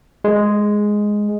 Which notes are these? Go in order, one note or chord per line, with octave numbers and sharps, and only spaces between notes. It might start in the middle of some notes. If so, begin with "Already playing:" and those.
G#3